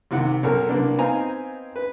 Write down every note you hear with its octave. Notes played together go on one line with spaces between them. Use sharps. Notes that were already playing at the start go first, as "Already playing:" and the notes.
C2 C3 D#3 F#5
B1 F#3 A4 A#4
C2 A#3 B3 D4
B3 C4 D#4 F5 G#5 A#5
B4